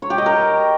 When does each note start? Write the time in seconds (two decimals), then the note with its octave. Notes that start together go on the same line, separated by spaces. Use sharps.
0.02 C#5
0.10 G4
0.18 D#5
0.26 A#4